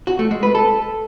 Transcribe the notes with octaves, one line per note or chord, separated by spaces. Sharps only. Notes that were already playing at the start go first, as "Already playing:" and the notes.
F#4
A3
G#3
B4
A4